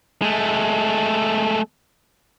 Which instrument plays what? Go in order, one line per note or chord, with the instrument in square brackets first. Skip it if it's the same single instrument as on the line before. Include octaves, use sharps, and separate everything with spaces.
[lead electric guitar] G#3 A3